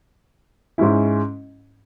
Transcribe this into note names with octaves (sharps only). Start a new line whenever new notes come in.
G#2 G#3 C#4 E4